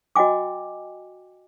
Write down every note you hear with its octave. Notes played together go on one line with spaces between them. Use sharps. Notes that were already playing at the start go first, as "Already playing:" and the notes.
F#4 D#5 G5 G#5 D6